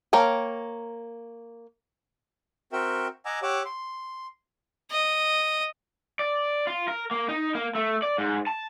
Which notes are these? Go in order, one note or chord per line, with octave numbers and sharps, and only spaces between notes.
A#3 A#4 C#5 G5
C4 F#4 A#4 E5 G5
D#5 F#5 G#5 A#5 D6 E6
G4 C#5 F#5 D6 E6
C6
D#5
D5
F4
A#4
A#3
D#4
A#3
A3
D5
G#2
A5